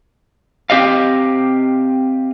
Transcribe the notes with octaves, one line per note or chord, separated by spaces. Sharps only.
C4 G4 D#5 F5